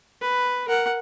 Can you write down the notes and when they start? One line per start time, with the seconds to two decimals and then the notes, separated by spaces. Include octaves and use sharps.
0.21 B4
0.68 A#4 F#5